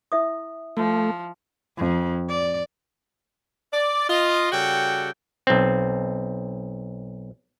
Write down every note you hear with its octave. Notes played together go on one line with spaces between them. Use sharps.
E4 E5 D#6
F3 A3
F2
D5
D5
F4 D#5
C#3 G3 F#4 G4 A4 G5
B1 C4